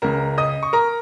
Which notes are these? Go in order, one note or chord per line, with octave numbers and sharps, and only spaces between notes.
C#2 C#3 A#4 A#5
D#5 D#6
C#6
A#4 A#5